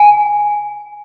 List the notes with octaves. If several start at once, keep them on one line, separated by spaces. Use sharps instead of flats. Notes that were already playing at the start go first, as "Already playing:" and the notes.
Already playing: G#5